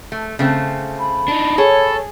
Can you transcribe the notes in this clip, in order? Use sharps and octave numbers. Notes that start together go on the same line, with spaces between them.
A3
C#3 A3 C4
B5
D4 D#4
G#4 A4 C#5